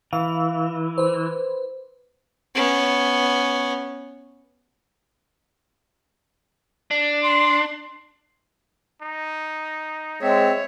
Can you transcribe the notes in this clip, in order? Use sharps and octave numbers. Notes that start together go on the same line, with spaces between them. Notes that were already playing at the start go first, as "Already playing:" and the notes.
E3 F5
B4 C5
B3 C#4
D4
C6
D#4
G#3 C4 C#5 E5